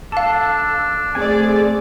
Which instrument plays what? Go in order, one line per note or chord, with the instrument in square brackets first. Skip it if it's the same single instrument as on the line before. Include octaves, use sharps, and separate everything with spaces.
[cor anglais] D4 [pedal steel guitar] A4 [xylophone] F5 A5
[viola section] A3 G#4 D5 [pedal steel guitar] C4 G#5